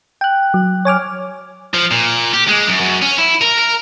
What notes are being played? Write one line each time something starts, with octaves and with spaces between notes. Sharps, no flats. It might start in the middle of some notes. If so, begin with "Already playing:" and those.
G5 F#6
F#3
C#5 G#5 D6 F6
F3
A#2
G4
G#3
F#2
F#2
C#4
E4
A#4
A#4